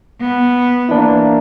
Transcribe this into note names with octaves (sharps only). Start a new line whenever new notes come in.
B3
E3 A#3 D4 E4